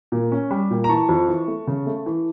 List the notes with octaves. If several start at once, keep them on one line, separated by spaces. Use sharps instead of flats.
A#2
C#4
G3
A#2
A#5
E3 A5 C#6
F2
E3
A3
C#3
A3
E3